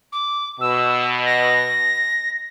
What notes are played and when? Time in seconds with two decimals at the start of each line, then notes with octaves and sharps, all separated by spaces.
0.12 D6
0.60 B2 E6
1.25 A#6